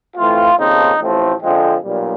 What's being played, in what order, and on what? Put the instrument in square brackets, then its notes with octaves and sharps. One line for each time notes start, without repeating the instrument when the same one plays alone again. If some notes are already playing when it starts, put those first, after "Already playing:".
[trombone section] A2 E3 A3 C4 F4
D#2 C#3 F3 A3 C4 D#4
A1 A2 F3 A3 C4
F2 D3 F3 G#3 C4
B1 A#2 G3